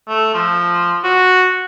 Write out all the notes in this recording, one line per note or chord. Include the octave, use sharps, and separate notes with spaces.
A3
F3
F#4